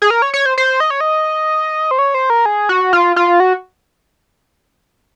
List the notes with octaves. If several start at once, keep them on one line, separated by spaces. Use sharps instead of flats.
G#4
A#4
C#5
C#5
C5
C5
D#5
C#5
D#5
C5
C#5
C5
A#4
G#4
F#4
F4
F4
F#4